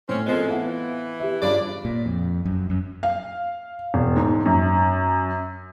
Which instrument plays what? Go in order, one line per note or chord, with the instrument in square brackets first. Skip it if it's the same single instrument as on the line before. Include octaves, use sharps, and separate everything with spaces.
[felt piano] A2 [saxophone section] C4 C#4
[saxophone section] A#2 F3 G#3 [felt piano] C4 C#4 A4
[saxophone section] E3 [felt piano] B3 F5 F#5
[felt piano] G4 E5
[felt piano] G2 F4 B5 [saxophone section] C#3 D4 D5
[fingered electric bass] A#2
F2
F#2
F#2
[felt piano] F5
E1
G#2
F#2